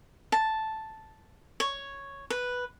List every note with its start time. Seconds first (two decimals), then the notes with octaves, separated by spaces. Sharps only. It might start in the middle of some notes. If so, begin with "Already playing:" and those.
0.32 A5
1.60 C#5
2.30 B4